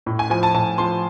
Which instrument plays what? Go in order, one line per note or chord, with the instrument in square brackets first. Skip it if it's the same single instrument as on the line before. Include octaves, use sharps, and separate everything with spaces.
[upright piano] A2
G#5
F3 G#5
A5
A2 A5
F3 C6